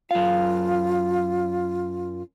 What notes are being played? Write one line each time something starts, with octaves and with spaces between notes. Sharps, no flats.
F#2 F4 F5